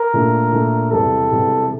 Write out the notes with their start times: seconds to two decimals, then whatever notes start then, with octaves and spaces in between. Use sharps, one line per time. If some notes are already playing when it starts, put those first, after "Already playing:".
Already playing: A#4
0.13 A#2 A3 D4
0.52 A#2 A3 D4
0.91 E1 E2 C3 G3 A4
1.31 E1 E2 C3 G3